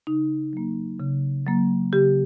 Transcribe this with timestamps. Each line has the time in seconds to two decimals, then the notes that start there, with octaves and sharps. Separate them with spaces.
0.07 C#3 D#4
0.53 F#3 A#3
1.00 C#3
1.46 F#3 A#3
1.92 C#3 G4